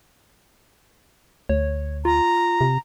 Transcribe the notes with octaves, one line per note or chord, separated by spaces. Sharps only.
D2 C#5
F4 A#5
C3